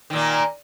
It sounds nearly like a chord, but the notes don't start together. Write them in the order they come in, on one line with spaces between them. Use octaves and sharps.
D#3 A#2 A#3